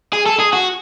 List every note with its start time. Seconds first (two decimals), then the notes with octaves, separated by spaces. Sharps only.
0.13 G#4
0.26 A4
0.39 G#4
0.53 F#4